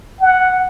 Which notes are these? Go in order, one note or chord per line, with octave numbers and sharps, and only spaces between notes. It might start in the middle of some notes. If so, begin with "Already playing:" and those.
F#5